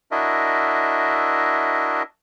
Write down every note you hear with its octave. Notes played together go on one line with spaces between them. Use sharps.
D4 E4 F#4 A#4 D#5 E5